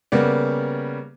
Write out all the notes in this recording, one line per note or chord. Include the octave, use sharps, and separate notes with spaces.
C#3 G3 A#3 B3